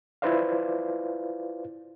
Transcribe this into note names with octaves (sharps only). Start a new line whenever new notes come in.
E4 F4 B4 C5 D5 F5